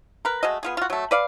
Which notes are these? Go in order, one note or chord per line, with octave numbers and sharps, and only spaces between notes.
A#4 B4
G#3 A3 F#4 D#5
B3 F4 G#4
F4 F#4
F#3 A3
B4 D5 F5